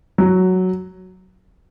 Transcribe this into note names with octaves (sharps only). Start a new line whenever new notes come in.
F#3